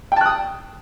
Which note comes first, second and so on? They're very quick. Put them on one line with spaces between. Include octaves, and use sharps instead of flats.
G5 A5 F#6 D#6